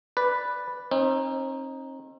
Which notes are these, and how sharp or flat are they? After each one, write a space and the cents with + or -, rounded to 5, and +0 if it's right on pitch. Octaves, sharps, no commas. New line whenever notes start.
B4 +0 D5 +0
C4 +45 D#4 +0